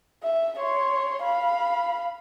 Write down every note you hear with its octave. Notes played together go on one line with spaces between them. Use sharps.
E5
C#5 C6
F5 B5